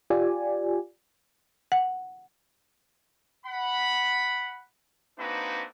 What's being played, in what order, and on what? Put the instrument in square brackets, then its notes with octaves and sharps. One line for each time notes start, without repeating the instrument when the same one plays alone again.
[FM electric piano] F4 G4 D5 G#5
[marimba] F#5
[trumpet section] F#5 B5
A#3 C4 D4 D#4 F#4 B4